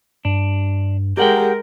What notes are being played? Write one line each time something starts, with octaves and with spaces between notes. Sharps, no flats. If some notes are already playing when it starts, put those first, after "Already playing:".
G2 D4
G#3 G4 A#4 F#5 G5